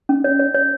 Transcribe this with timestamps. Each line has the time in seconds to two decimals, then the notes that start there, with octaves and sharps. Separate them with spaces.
0.09 C#4
0.24 C#5
0.39 C#5
0.54 C#5